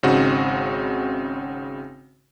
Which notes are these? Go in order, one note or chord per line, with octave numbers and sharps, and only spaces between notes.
G#1 C#3 C4 D#4 F#4